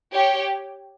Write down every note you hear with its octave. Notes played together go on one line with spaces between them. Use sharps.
G4 C#5 G5